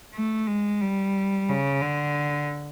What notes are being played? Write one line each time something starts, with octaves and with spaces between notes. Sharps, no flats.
A3
G#3
G3
C#3
D3